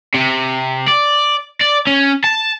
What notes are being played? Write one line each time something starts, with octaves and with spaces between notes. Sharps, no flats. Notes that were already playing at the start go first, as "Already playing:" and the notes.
C3
D5
D5
C#4
A5